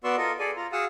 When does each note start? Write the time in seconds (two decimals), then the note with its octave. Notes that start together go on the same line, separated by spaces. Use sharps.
0.04 B3 F#4 D5 C6 C#6 E6
0.17 F4 A4 A#4 D#5
0.39 G#4 A4 D5 G#5
0.57 F4 A#5
0.73 F#4 G#4 F5 F#5 D#6 E6